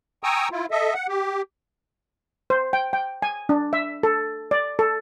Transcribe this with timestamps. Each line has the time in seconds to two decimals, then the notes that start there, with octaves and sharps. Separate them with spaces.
0.23 G5 G#5 A#5 C#6 D#6 E6
0.52 E4 F4
0.71 A4 D#5 E5
0.94 F#5
1.08 G4
2.50 C5
2.73 G5
2.93 G5
3.22 G#5
3.49 D4
3.73 E5
4.03 A4
4.51 D5
4.79 A4